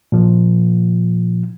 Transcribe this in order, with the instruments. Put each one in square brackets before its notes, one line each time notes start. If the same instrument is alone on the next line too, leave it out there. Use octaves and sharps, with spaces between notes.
[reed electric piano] A#2 F3